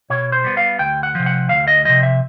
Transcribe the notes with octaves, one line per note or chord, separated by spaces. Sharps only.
B2 C#5
C5
G3 B3
F5
D2 G5
F#5
C3 F3
F#5
D2 F5
D#5
C3 F3 D#5
E5